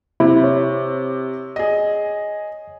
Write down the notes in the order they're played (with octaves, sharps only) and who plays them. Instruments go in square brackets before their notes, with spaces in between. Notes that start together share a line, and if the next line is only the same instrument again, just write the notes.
[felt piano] C3 [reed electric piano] E4
[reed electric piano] C#5
[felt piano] G#4 D#5